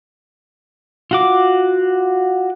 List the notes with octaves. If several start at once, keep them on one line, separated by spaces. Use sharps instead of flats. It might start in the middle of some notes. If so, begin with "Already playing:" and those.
F4 F#4 D6